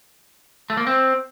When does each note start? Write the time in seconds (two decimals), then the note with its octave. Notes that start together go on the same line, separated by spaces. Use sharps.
0.70 A3
0.77 A#3
0.87 C4